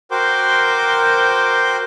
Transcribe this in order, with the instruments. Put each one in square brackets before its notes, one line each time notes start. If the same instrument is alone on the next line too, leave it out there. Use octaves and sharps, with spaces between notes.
[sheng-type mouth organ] F#4 A#4 C5 G5 C6 D6